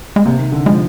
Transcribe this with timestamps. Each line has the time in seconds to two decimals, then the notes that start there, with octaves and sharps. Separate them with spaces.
0.16 G#3
0.25 C3 A#3
0.39 D#3
0.52 D3
0.66 F3 G#3